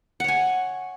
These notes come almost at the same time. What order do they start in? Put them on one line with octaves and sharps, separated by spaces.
F#5 C#5 G#5